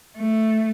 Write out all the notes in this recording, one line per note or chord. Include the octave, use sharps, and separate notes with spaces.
A3